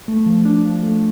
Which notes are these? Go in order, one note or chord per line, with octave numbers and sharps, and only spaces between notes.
A3
F3
D4
F3
A3